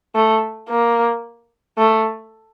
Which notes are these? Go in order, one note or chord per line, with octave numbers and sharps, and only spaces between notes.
A3
A#3
A3